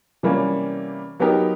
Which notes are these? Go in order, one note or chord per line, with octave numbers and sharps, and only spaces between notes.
C3 E3 G3 A#3 C#4
F#3 B3 D#4 G4 A#4